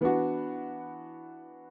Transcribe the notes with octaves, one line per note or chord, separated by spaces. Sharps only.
E3 B3 D4 F#4